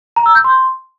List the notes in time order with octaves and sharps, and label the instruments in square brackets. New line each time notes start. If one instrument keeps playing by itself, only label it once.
[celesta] A#5
E6
G6
C6